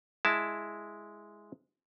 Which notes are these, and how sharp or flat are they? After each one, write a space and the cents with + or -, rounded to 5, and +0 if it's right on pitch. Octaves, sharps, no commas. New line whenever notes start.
G#3 +0 E4 +0 A5 +0